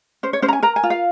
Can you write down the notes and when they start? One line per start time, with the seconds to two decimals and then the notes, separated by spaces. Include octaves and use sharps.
0.23 C#4 C5
0.33 C#5
0.42 C#4 C5
0.48 A#5
0.53 G#5
0.63 A#4 A#5
0.76 G#5
0.83 F4
0.90 F5